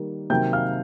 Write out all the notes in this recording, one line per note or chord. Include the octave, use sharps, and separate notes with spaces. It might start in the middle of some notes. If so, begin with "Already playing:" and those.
Already playing: D#3 G3 A#3
C3 D#3 F#3 A#3 G5 G6
F5 F6